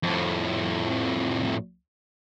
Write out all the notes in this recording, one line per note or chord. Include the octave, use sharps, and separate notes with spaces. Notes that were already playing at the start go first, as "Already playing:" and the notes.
F2 A2